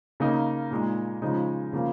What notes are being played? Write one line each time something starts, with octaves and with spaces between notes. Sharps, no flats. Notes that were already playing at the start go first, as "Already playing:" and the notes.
C#3 A#3 D#4
A#2 G#3 D#4
C#3 F3 G#3 D#4
C#3 F3 A#3 F4